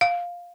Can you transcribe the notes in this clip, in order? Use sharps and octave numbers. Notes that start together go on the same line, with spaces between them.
F5